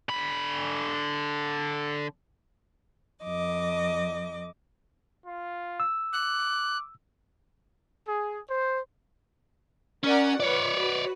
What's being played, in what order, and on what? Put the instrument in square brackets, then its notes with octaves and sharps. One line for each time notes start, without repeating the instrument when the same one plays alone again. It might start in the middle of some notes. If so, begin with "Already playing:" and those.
[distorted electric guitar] D3 B5
[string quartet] F2 D#5 D6
[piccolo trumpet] F4
[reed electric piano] E6
[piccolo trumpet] D6 [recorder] F#6
[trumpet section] G#4
C5
[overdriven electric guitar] C#4 [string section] A#4 D5 F#5
[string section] F4 B4 [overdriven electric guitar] C#5 D5
[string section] F#4 B4